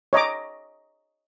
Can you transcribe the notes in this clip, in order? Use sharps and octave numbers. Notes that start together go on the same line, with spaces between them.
C#5 D#5 A#5 D6